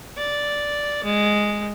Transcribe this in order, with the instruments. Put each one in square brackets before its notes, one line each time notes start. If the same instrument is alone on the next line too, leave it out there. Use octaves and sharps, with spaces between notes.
[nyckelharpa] D5
G#3